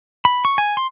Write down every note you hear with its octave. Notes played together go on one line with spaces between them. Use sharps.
B5
C#6
G#5
C6